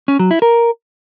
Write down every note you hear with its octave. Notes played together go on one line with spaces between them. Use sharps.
C#4
F#3
E4
A#4